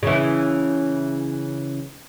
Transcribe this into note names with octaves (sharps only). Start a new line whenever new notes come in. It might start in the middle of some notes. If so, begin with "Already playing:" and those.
C#3 E3